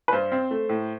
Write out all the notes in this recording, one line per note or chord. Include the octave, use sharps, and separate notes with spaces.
B4
G2 C5
C4
A3
A2